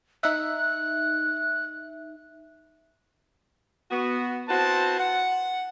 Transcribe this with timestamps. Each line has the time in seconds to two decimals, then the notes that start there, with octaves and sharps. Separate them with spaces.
0.23 D#4 E5 F#6
3.91 B3 F#4
4.49 C4 E4 F#4 B4 C5 A5
5.00 F#5